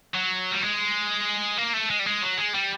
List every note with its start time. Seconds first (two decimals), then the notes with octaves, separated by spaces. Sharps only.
0.14 F#3
0.51 G3
0.62 G#3
1.57 A#3
1.73 A3
1.90 G#3
1.99 G3
2.06 G#3
2.22 F#3
2.38 G#3
2.54 G3